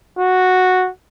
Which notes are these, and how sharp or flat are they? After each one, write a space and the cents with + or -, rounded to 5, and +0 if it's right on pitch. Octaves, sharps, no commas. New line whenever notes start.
F#4 -5